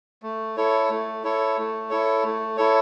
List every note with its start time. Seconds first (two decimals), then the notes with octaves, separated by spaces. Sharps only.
0.23 A3
0.57 E4 A4 C#5
0.89 A3
1.24 E4 A4 C#5
1.57 A3
1.90 E4 A4 C#5
2.23 A3
2.57 E4 A4 C#5